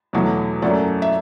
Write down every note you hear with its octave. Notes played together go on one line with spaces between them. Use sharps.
E2 B2 F#3 A3
F#2 F#3 A3 D5
E5